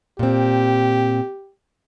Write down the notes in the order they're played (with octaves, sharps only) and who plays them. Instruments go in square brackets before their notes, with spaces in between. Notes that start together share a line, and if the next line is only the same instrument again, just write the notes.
[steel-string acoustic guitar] A#2 C4 [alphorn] G4